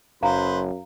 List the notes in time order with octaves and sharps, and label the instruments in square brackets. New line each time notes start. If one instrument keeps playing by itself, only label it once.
[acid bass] F#1 [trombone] F#2 [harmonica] B4 C5 [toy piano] F5 A#5